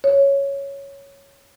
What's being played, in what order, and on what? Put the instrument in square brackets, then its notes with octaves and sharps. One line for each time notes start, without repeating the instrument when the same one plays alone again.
[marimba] C#5